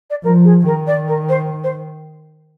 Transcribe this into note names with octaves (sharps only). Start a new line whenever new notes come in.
D5
F3 A#4
G#4
D#3 A#4
D5
A#4
C5
C5